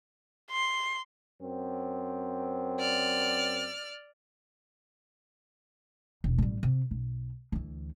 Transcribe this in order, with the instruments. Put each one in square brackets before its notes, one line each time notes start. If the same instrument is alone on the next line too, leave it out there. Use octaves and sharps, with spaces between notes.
[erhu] C6
[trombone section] F#2 C4
[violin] D5 F6
[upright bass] E1
A1 G3
C3
B1
D2 E3